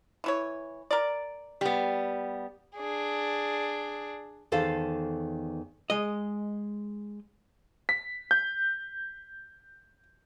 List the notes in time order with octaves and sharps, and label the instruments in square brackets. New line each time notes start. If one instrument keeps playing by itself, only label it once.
[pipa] E3 E4 C#5
A#4 D5
[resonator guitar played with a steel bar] G3 B3
[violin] D4 G#4
[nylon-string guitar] E2 D#3 A4 C5 F5
[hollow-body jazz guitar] G#3 D#5
[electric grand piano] B6
G6